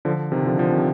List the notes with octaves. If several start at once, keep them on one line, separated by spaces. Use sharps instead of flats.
D3 F3
C3 D#3
D3 F3
D3 F3
C3 D#3